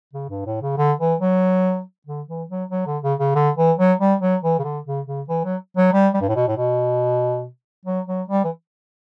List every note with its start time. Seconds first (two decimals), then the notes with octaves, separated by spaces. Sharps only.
0.14 C#3
0.30 G2
0.46 A2
0.62 C#3
0.78 D3
1.00 E3
1.21 F#3
2.07 D3
2.28 E3
2.49 F#3
2.71 F#3
2.87 D3
3.03 C#3
3.20 C#3
3.35 D3
3.57 E3
3.78 F#3
4.00 G3
4.21 F#3
4.43 E3
4.59 C#3
4.64 D3
4.86 C#3
5.07 C#3
5.29 E3
5.45 F#3
5.77 F#3
5.93 G3
6.14 G3
6.21 G2
6.29 A2
6.36 B2
6.48 A2
6.57 B2
7.85 F#3
8.07 F#3
8.28 G3
8.44 E3